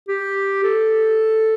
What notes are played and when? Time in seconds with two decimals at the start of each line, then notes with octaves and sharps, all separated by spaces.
0.08 G4
0.64 A4